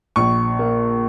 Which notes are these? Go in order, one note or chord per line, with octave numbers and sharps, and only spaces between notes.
A#1 C#6
A#3